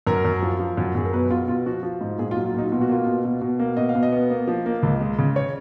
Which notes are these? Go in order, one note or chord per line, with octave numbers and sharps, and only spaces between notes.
F#2 A#4
F#2
F3
F3
F#2
F#2 G#4
A#4
B2 B4
B2 F4
B2 F4
F3 F#4
F3
G#2
A#2 G#4
F4
F#3
F4
A#2 D#4
B2 F4
F#4
A#3 F4
B2
B2
B2
A#3
B2 D#5
F5
B2
D#5
B3
A#3
F3
A#3
C#2
G#3
C#3
C#5